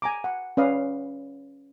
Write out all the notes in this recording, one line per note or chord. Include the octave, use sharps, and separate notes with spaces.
G#5 A#5 D6
F#5
C#4 B4 D5 F5 D#6